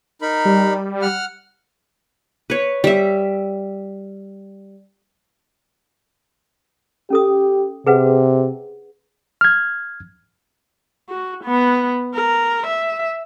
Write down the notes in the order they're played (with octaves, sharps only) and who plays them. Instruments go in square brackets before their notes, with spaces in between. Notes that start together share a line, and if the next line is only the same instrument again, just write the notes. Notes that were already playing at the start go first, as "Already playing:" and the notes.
[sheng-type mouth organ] D#4 A#4 B5
[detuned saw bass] G3
[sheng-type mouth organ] F#5 F6
[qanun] B4 C#5
G3 E5
[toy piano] C#4 A4 D#6 [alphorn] G4
[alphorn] C3 [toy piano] G#4 B4 F#5
[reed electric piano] F6 G#6
[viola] F#4
B3
A#4
E5